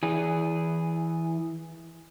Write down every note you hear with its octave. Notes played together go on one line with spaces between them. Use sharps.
E3 G#4